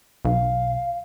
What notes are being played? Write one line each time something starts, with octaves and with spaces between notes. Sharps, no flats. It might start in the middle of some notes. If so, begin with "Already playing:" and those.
B1 F5